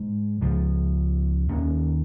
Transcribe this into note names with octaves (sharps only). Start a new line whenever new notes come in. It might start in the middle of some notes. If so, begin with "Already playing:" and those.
Already playing: G#2 G#3
C#2 C#3 F3
D#2 D#3 A#3 C#4